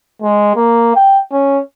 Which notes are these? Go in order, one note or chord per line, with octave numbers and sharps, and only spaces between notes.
G#3
A#3
G5
C#4